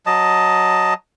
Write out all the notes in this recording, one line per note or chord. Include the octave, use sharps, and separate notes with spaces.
F#3 D#5 A5